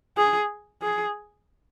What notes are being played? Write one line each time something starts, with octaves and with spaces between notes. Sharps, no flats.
G#4
G#4